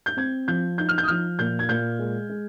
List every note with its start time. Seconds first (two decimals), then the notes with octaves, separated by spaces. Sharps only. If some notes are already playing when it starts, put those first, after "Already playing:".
0.06 G6
0.17 C4 G#6
0.48 F3 G6
0.78 D#4 G6
0.89 F6
0.98 G6
1.03 D#6
1.08 F3 F6
1.39 A#2 G6
1.59 G#6
1.69 A#2 G6
1.99 G#3
2.29 G#3